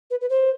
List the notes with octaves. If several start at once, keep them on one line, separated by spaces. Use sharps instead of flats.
B4
B4
C5